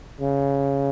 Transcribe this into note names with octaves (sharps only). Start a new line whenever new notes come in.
C#3